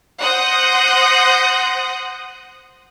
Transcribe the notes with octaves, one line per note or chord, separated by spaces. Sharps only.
C5 F#5 C6 D#6 G6 A#6